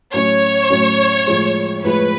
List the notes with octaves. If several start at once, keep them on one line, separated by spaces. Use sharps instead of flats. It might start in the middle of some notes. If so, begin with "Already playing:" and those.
A2 F#3 C#4 C#5
A2 F#3 C#4
A2 F3 G#3
A2 F3 G#3 B4